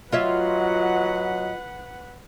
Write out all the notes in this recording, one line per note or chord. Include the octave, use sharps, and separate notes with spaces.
F#3 F4 B4 C#5 D#5 E5 F#5